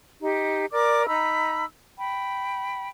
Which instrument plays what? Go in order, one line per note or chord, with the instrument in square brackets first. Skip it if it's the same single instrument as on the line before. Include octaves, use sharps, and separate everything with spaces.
[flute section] D#4 G4
A#4 D5 D6
D#4 A#5 B5 E6
G5 B5